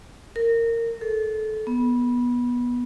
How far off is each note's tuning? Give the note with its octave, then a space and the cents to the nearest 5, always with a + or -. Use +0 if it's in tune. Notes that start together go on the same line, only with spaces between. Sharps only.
A#4 -20
A4 -25
B3 -20